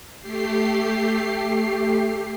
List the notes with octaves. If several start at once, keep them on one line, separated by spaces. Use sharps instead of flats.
A3 G4 C7